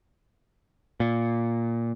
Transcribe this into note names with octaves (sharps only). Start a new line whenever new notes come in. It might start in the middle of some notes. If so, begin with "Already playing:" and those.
A#2